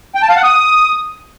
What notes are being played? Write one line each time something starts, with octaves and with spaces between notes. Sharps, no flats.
G5
A5
F5
F#5
D#6